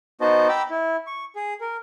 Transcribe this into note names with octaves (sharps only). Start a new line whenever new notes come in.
B3 D#4 F#4 C5 D#5 A5
G5 A#5 B5 D6 E6
E4
C#6
G#4
A#4